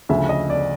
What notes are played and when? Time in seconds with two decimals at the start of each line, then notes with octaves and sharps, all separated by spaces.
0.09 D2 C#3 F3 E5
0.29 D#5
0.50 D5